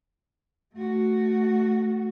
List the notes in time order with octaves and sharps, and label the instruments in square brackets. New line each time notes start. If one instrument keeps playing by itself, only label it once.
[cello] A3 F#4